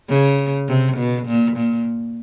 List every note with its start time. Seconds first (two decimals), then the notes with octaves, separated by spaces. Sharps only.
0.10 C#3
0.68 C3
0.97 B2
1.27 A#2
1.57 A#2